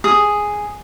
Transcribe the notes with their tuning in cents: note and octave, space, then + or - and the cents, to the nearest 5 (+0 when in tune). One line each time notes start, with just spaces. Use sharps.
G#4 +0 D#6 +0